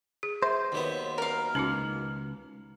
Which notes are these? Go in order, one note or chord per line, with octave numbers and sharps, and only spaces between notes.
G#4
C5 E5
D#2 F#3 B3
A#4 F5
C#2 C#4 D#4 F#4